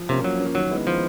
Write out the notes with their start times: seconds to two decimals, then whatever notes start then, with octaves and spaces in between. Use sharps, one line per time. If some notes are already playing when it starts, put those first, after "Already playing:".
Already playing: F3
0.09 C3 A#3 C#4
0.24 F3 F#3
0.40 A#3 C#4
0.55 D#3 F#3
0.70 G#3 B3 E4
0.86 D#3 F3